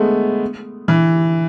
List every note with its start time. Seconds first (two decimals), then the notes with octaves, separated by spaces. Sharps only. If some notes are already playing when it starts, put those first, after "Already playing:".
Already playing: G#3 A3 B3
0.88 E3